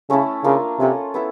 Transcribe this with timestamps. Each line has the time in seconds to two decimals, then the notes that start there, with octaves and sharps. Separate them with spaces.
0.09 C#3 A3 C#4 E4 A4
0.44 C#3 A#3 D4 F4
0.79 C3 C#4 F4 A4
1.14 B3 E4 A4